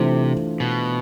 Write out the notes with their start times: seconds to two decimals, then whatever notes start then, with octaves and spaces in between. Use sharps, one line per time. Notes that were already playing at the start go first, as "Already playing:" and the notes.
Already playing: C3 E3 A3 D4 F4 C5
0.60 B2